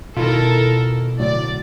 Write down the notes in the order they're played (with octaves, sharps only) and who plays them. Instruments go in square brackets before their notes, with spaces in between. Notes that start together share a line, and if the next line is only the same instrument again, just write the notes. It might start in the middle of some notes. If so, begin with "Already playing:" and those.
[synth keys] B2 E4 [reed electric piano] D#3 F4 [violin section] A4 A#4
[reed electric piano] A2 D3 F#3 [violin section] D5